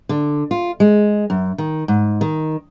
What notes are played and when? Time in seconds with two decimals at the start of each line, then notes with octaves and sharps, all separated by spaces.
0.09 D3
0.51 F4
0.80 G#3
1.30 F#2
1.58 D#3
1.88 G#2
2.21 D#3